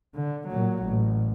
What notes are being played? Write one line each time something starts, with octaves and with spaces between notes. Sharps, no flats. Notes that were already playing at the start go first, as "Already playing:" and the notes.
D3
A#2 F#3
A1